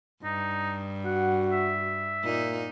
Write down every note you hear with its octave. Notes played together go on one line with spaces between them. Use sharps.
G2 D#4
F#4 F#5
E5
A#2 A#3 D#4